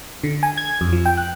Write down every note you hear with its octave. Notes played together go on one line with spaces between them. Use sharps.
D3
G#5
G#6
F2
F3
G5
F#6